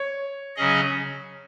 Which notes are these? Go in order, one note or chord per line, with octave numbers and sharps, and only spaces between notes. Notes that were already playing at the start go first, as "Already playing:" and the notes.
Already playing: C#5
C#3 F#3 C#4 G#4 D#5